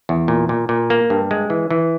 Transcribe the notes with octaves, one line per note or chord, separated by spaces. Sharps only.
E2
A#2
A#2
A#2
A#3
G2
G#3
E3
E3